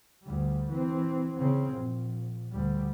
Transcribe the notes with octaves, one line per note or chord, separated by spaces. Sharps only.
D2 G3
E3 C4
C#3 C4
A#1
D2 G3